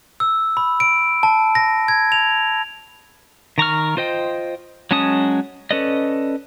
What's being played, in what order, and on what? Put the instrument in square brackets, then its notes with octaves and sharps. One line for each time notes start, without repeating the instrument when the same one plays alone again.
[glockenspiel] E6
B5
D7
A5
A#6
G#6
F7
[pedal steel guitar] D#3 A#5 C#6 F6
F4 C5 D#5 G5
F#3 G#3 C#4 A5 D#6
C#4 A4 B4 D5 D#5